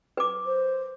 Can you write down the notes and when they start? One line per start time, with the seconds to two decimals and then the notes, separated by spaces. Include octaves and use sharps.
0.17 B4 D6
0.46 C5